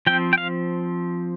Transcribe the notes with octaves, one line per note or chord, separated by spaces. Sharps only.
F3 C4 G5
G5
F5